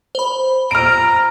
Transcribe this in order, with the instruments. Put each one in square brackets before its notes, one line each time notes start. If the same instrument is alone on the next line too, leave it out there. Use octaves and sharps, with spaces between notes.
[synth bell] C5 B5
[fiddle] A#5 [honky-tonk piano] F6 D7